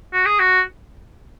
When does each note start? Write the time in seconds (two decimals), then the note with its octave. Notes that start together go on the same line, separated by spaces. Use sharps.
0.13 F#4
0.26 G#4
0.39 F#4